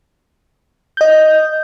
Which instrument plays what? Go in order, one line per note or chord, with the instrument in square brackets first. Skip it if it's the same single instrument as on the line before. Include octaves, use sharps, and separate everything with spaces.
[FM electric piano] D#5 G6